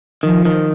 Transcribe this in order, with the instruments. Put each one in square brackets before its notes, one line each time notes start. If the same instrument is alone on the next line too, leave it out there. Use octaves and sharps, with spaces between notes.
[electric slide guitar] D#3 [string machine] F3
[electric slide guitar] D#3